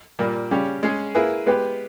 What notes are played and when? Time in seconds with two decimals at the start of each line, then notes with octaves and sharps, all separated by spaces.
0.19 A#2 G3 A#3
0.51 C#3 G3 C#4 G4
0.83 G#3 C#4 G#4
1.15 A#3 E4 G#4 B4
1.46 G#3 B3 G4 B4